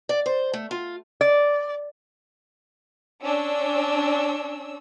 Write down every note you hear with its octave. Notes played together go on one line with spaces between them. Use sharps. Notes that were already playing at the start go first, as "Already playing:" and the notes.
D5
C5
A3
F4
D5
C#4 D4 E6